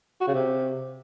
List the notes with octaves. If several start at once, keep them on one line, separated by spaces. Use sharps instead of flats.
F#4
C#3
C3